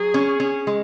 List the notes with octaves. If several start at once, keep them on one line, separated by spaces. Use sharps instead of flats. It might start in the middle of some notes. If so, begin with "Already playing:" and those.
Already playing: F#3 G#4
C#4
C#4
G#3